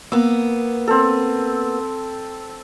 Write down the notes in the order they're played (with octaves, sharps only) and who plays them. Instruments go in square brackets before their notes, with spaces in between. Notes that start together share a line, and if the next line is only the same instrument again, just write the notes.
[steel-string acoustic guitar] A#3 B3 [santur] E6
[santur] C4 A4